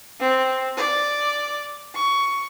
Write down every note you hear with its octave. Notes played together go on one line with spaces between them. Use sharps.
C4
D5
C#6